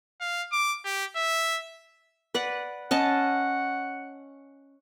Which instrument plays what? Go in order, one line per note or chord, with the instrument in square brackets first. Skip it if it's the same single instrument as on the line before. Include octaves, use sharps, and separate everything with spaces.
[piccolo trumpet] F5
D6
G4
E5
[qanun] B4 D5 F#5
[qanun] C#4 D#5 A5 [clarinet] F#5